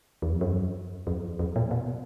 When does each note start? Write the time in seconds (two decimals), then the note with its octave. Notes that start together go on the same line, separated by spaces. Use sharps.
0.22 E2
0.32 F2
0.41 F#2
1.07 F2
1.39 F2
1.56 A#2
1.71 B2